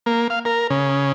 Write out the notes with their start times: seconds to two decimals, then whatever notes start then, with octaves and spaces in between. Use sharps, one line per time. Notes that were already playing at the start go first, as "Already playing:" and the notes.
0.06 A#3
0.30 F5
0.45 A#4
0.70 C#3